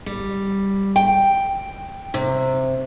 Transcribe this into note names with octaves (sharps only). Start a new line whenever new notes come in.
G3
G5
C3